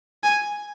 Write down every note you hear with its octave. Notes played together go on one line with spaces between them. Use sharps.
G#5